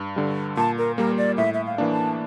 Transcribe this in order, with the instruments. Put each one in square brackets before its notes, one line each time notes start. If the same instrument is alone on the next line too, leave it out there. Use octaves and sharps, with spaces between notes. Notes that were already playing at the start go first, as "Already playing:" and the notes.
Already playing: [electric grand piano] G2
D3 G3
[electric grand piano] A#2 [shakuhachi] A5
[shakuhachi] A#4
[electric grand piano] G3 A#3 [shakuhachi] A#4
[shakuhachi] D5
[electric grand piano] A2 [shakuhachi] E5
[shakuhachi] E5
F5
[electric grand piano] E3 A#3 D4
[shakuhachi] A5